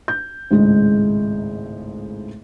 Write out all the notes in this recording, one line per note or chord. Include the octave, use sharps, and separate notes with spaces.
G6
G#1 C#2 A2 G#3